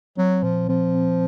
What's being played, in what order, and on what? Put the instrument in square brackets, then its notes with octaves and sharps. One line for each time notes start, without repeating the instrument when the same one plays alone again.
[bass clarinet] F#3 [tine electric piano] C4
[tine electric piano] A#2 [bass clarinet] F3
[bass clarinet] F3 [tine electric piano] C4
[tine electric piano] C4